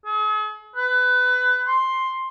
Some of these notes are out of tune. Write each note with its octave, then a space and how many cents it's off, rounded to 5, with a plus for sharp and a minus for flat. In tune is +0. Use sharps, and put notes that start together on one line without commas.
G#4 +45
B4 +20
C6 +10